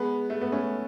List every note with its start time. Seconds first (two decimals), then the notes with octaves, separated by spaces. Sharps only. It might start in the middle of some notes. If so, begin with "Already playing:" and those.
Already playing: G#3 B3
0.30 A3
0.41 B3
0.52 A3 C#4